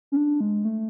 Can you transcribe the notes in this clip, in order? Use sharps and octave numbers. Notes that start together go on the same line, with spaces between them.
C#4
D4
G#3
A3